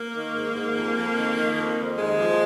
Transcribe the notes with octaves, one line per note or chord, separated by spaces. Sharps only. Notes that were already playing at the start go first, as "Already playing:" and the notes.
Already playing: A#3
D#3
G#2
G#2
F2
F2
D#3
D#3
F2
F2
D#2 G#3
F3